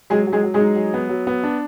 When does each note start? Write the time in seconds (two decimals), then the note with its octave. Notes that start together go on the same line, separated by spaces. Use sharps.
0.10 F#3 G#3 G#4
0.27 F#3
0.32 G#3 G#4
0.44 F#3
0.54 G#3 G#4
0.60 D#4
0.76 F#3
0.94 B3
1.09 F#3
1.27 B3
1.44 D4